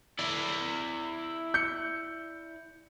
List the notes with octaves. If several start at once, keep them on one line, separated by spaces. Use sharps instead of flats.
E4 D5
G6 C#7